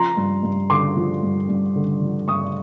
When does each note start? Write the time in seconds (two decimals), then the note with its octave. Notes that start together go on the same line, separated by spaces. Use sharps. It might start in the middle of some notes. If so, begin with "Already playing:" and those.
Already playing: F3 A#5 C6
0.17 G2
0.43 G2
0.70 D3 C6 D6
0.97 F3
1.23 G2
1.49 G2
1.76 D3
2.02 F3
2.28 G2 C#6 D#6